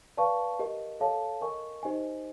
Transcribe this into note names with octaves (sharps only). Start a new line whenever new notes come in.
B4 D5 F5 A5 C#6
G4 A#4 D#5
A4 C#5 F5 A5
A#4 D#5 G#5 C#6
D#4 G4 C5 D#5 G#5